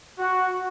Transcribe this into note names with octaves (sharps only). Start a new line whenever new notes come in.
F#4